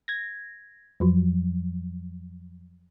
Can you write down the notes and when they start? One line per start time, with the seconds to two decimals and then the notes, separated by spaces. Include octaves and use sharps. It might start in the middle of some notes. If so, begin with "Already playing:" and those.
0.08 G#6 A#6
1.00 F2 F3 F#3